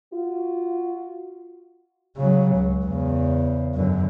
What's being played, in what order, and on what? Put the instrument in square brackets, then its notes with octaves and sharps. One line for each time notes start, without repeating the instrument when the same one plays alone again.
[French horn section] F4 F#4
[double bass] C#3 F#3
C#2
E2 C#3
F#2 D3